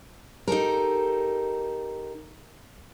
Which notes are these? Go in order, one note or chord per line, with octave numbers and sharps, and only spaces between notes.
D#4 G4 A4 A#4